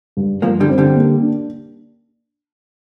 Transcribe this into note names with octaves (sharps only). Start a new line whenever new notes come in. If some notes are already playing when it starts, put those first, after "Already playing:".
G2
G2 F3 A#3
D3 G3
C4
D3 G3
A#3
D4